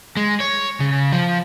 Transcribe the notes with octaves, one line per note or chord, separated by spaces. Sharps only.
G#3
C#5
C#3
F3